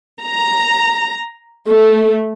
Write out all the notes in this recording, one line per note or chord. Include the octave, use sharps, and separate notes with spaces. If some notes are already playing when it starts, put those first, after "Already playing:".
A#5
A3